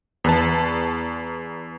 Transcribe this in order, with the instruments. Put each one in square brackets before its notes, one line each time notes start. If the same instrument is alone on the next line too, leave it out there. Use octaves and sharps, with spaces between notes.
[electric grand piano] E2 B4 A5